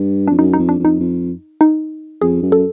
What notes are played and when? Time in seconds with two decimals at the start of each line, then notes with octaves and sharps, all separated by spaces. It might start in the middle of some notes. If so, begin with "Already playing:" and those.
Already playing: G2
0.28 F2 D4
0.39 F#2 D#4
0.54 D#4
0.59 F2
0.69 D4
0.79 F2
0.85 D#4
1.00 F2
1.61 D#4
2.21 F2 G#4
2.42 F#2
2.52 A4